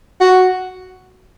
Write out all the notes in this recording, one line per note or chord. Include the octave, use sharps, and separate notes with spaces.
F#4